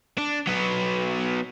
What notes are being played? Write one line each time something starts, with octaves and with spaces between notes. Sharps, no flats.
D4
F#3 B3